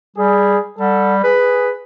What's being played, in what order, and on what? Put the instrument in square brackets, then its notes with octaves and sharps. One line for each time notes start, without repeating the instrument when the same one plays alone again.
[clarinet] G3 [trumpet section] G#4
[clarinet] G3 [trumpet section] A4 F#5
[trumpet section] G#4 [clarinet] B4